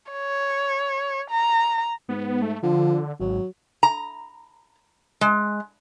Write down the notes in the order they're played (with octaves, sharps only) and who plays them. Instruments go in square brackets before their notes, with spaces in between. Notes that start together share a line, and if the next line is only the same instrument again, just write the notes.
[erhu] C#5
A#5
[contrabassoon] G#2 [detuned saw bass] B3
[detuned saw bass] A3
[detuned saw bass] D3 [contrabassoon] F3
[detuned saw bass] G#1 [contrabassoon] F#3
[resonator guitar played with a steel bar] A#5
G#3